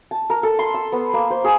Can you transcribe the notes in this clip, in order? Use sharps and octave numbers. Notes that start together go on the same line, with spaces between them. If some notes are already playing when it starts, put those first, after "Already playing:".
A5
A#4
A4
C6
E6
B3
A#3
C5
G#4